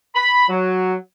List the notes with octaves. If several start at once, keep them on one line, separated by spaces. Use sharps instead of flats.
B5
F#3